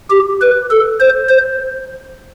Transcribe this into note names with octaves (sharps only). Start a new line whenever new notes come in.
G4
B4
A4
C5
C5